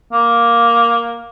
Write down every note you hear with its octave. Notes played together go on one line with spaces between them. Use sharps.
A#3